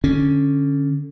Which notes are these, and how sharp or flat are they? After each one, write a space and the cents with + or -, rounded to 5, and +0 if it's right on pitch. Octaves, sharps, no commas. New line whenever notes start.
D3 +0 C#4 +0